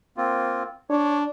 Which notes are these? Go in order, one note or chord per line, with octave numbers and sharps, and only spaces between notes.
A#3 C4 F4
D4 C#5